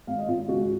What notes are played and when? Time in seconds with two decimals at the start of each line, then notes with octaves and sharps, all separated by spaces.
0.07 G#1 F5
0.18 D#5
0.28 G#1 F4
0.48 C#2 F#4